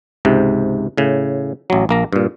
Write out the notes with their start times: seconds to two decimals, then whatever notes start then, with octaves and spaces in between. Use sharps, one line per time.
0.25 C#2 G#2 C3
0.98 A2 C#3
1.70 A1 F#3
1.89 A#1 A#3 A#5
2.13 G2 A#2